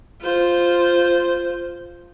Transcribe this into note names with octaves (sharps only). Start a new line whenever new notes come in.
F4 C5